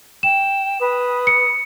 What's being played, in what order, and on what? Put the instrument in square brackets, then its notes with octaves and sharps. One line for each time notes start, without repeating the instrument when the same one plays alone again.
[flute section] G5 [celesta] E7
[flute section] B4 D#6
[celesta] C#7